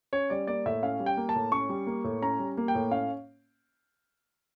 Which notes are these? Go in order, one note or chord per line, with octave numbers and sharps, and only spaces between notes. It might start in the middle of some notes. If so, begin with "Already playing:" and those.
C#4 C#5
G3 D5
A#3 D5
A2 E5
C#4 F5
G3
G5
A#3
A5
A2
C#4 C#6
G3
A#3
A2
C#4 A#5
G3
A#3
G5
A2
C#4 F5